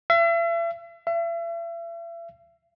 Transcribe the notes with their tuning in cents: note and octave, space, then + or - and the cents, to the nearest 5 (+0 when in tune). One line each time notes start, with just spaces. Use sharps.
E5 +40
E5 +40